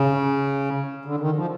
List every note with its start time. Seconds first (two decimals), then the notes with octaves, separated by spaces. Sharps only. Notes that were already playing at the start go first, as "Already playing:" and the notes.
Already playing: C#3
1.05 D3
1.20 D#3
1.36 F3